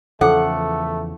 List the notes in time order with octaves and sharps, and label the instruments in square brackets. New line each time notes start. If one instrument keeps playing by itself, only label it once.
[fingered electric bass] E2 C#3 F3 [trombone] A3 [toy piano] A4 D6 [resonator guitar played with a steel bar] F#5